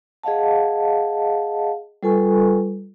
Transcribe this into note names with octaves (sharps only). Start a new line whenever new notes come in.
G#4 D#5 F5 F#5 A5
G3 F4 A4 B4 G#5 C#6